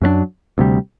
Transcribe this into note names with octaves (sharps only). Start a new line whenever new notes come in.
F#2 F#3 A3 D4
D2 C3 G3